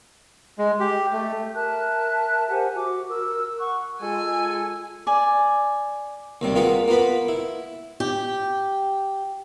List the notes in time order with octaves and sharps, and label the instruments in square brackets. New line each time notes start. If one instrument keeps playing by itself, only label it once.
[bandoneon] G#3
G4
A3
[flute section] A#4 E5 A5 F#6
G4 C5 F#5 G#5
F#4 D6
A#4 E6
F#5 C#6 F#6
[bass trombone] G#3 [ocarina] F4 [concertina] A4 [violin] G#5
[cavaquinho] D5 G#5
[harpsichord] D#2 C3 G3
A#3 F4 G#4 B4 F#5
A#3 B3 F4 B4 B5
E4
[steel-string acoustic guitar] G4